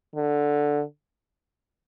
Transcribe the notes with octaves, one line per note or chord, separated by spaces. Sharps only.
D3